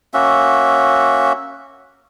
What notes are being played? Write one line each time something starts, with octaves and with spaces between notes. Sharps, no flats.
A#3 C#4 F#4 E5